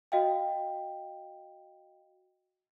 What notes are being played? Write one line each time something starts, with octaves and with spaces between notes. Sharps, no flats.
F#4 D#5 F5 G5